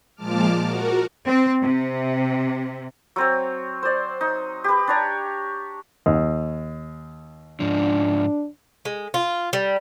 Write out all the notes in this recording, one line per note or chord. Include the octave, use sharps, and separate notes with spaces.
A#2 F3 G#3 A5 D6 F6
F#4 A#4
C4
C3
F#3 C4 C#5
C5 D5
D#4
G4 B4
D4 C#5 A#5
D#2
G#2 F3 D4
G#3
F4
G3